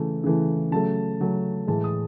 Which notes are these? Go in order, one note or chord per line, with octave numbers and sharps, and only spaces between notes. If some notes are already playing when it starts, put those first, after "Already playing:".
Already playing: C#3 E3 A3
C#3 E3 A3
C#3 F#3 A3 A5
C#3 F#3 A3
A2 E3 G#3 A5
D#6